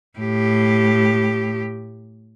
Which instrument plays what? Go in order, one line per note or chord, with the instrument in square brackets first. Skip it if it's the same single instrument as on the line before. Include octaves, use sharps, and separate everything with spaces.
[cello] A2 G4